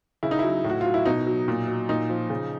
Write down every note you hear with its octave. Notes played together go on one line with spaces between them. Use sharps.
C#3 E4
D#4
F#3 E4
A2
F#4
F#3 F4
E4
B2 D#4
F#3
A#2
F#3
A#2 D#4
F3
C#3